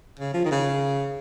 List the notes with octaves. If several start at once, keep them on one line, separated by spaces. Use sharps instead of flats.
C#3
F3
D#3
C#3